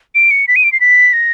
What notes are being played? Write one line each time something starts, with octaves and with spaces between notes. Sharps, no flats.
D7
C#7
B6
D#7
D7
C7
B6
A#6